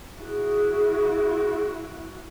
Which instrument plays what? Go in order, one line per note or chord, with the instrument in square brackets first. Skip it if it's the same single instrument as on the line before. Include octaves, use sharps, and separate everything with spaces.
[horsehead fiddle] E4 F#4 [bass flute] G#4